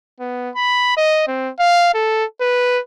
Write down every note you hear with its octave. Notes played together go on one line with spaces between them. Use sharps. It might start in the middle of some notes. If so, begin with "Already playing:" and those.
B3
B5
D#5
C4
F5
A4
B4